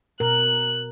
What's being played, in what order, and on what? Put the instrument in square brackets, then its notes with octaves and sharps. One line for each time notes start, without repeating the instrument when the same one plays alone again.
[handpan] B2 A#4 [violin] F#6